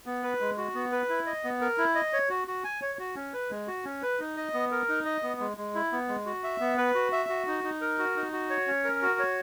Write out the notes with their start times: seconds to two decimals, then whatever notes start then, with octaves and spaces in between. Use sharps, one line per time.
0.06 B3
0.23 B4
0.40 G#3
0.57 F#4
0.75 B3
0.92 B4
1.09 E4
1.26 D#5
1.44 B3
1.61 A#4
1.78 E4
1.95 D#5
2.13 C#5
2.29 F#4
2.48 F#4
2.64 G#5
2.82 C#5
2.99 F#4
3.16 C#4
3.33 B4
3.51 G#3
3.67 F#4
3.85 C#4
4.02 B4
4.20 D#4
4.37 D#5
4.54 B3
4.71 A#4
4.89 D#4
5.05 D#5
5.23 B3
5.40 G#3
5.57 G#3
5.75 E4
5.92 B3
6.08 G#3
6.26 F#4
6.44 E5
6.60 B3
6.78 B4
6.95 F#4
7.12 E5
7.29 F#4
7.47 D#4
7.64 D#4
7.81 A#4
7.98 F#4
8.16 D#4
8.32 F#4
8.50 C#5
8.67 C#4
8.84 A#4
9.02 F#4
9.19 C#5